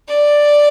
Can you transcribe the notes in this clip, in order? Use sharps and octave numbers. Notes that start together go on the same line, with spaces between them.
D5